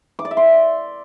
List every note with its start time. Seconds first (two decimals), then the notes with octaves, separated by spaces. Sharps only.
0.19 D6
0.25 D5
0.31 E5
0.37 C6